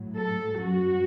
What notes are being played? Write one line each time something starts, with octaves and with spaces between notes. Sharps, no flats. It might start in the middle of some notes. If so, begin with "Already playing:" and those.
Already playing: A2 F#3
A4
F#2 F#3 F#4